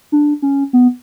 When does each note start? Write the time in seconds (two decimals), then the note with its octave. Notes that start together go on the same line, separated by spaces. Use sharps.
0.12 D4
0.42 C#4
0.73 B3